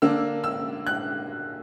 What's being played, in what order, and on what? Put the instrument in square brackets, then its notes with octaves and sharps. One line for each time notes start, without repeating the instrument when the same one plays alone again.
[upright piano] D3 A#3 D4 E6
E6
F#6